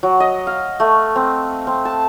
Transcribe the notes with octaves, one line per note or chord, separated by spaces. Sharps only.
F#3
D#5
F5
A3
C4
C4
A5